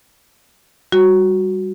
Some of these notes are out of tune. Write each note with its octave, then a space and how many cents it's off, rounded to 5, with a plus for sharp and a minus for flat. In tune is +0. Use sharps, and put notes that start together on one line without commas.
G3 +0 F#4 +0